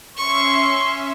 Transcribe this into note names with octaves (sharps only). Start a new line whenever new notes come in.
C#4 E5 C6 C#6